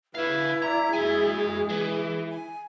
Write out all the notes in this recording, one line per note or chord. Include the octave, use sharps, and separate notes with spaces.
E4 B4 C#5 F5
D5 A#5
G#3 F#4 G#4 G#5
E3
G#5